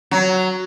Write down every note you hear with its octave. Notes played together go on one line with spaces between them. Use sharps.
F#3